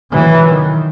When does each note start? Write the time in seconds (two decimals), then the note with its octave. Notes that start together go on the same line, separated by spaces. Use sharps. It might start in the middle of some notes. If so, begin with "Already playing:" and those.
0.11 E3 F#3
0.49 D#3